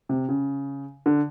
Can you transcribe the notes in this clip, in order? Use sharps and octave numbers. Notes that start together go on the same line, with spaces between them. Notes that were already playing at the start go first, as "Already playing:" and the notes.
C3
C#3
D3